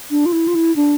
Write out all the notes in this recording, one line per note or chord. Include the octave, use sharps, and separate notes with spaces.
D4
F4
E4
F4
E4
D4